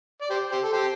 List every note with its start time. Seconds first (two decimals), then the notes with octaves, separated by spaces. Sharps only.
0.22 D5
0.30 G4 C5
0.52 G4 C5
0.64 A4
0.73 G4 C5